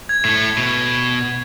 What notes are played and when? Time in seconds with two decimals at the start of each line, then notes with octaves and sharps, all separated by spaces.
0.09 G#6
0.25 A2 A3
0.58 B2